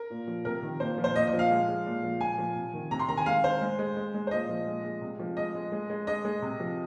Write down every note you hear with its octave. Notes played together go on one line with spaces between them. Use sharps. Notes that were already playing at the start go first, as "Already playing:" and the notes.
Already playing: A#4
A#2
F3
C3 A#4
D#3
A#2 C5
F3
C5
A#2 D#5
D#5
F3
F5
G#3
G#3
A#2
F3
A#2 G#5
F3
C3
D#3
C3 A#5
C6
D#3 A#5
G#5
G#3 F5
G#3 C5
G#3
G#3
G#3
G#3
C5
A#2 D#5
F3
G#3
G#3
C3
F3
G#3 D#5
G#3
G#3
G#3
G#3 D#5
G#3
C3
F3